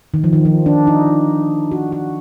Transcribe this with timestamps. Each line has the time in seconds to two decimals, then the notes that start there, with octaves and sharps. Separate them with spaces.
0.14 D#3
0.24 F3
0.33 D#3
0.45 F3
0.66 D4
0.87 D#4
1.72 F#4
1.92 F#4